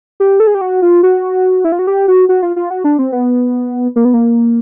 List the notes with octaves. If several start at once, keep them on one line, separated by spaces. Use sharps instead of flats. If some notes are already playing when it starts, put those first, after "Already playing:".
G4
A4
G#4
G4
F#4
F4
F#4
E4
F4
F#4
G4
F#4
F#4
F4
F4
F#4
D4
C4
B3
A#3
B3
A#3